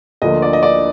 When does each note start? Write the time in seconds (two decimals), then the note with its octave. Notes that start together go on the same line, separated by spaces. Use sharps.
0.22 D2 D3 F3 A#3 D#5
0.42 D5
0.53 D#5
0.63 D5